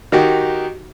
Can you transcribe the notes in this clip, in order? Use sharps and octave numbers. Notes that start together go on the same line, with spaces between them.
D#3 D#4 F#4 G4